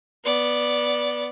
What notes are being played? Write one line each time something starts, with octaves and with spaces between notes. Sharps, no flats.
B3 D5